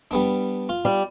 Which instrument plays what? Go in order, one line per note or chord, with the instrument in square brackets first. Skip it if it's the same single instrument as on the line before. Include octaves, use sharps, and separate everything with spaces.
[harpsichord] G3 B3 D4
F4
[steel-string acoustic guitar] G3